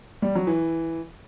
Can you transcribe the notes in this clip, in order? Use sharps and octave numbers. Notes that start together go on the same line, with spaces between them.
G3
F#3
E3